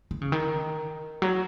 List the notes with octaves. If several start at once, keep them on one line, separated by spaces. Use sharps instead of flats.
D#3
C#3
D#3
F#3